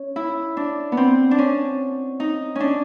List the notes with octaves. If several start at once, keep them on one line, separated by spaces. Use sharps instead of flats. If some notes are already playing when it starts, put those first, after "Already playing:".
Already playing: C#4
E4
D4
B3
C4
D4
C#4
D#4
C#4 D4